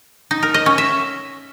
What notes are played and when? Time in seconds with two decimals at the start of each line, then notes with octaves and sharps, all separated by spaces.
0.31 D#4
0.43 A#4
0.54 D#5
0.66 C#4
0.78 E5